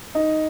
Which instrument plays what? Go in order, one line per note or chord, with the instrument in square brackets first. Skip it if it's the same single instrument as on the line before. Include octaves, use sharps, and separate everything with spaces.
[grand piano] D#4